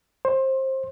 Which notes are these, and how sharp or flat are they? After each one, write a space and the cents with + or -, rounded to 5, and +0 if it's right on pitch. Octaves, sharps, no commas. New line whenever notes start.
C5 +20